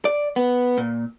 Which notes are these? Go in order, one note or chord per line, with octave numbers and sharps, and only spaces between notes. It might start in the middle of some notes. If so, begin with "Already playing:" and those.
D5
B3
A#2